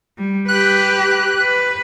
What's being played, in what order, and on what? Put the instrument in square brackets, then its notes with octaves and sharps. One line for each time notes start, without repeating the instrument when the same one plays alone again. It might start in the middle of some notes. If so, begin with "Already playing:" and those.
[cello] G3
[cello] G4 B4 [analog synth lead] F#6
[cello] B4